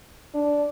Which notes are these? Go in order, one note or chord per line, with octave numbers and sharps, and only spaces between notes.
D4